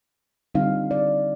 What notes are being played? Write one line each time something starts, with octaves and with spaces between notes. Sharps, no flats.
D3 G3 C4 D#4 F5
D5